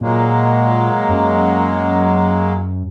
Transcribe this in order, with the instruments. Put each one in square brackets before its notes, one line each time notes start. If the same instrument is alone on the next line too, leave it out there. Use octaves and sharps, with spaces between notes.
[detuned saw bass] A#2 [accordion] F#3 G#3 A#3
[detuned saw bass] F#2